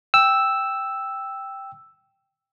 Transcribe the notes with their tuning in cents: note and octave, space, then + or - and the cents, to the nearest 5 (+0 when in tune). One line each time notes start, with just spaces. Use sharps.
G5 +0 E6 +0